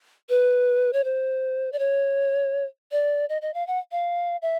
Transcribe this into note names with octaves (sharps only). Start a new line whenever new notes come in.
B4
C#5
C5
D5
C#5
D5
D#5
D#5
F5
F#5
F5
E5